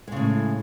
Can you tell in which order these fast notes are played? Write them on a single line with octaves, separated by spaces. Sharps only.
G#3 C#3 A2